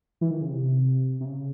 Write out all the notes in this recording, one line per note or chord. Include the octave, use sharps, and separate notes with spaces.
E3
D#3
C#3
C3
C3
C#3